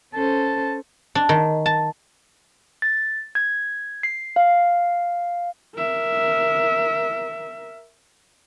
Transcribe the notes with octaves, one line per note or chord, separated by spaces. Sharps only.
C#4 A4 C5 A5
D4
D#3
A5
A6
G#6
C7
F5
A#4 E5